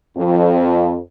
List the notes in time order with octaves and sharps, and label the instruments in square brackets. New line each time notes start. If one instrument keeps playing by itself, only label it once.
[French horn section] F2